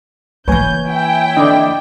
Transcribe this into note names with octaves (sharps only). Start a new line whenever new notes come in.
E3 A#3 B4 C#5 G#5 G6
E4 G5
D3 D5 D#5